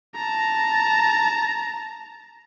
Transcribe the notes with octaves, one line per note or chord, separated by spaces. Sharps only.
A5 A#5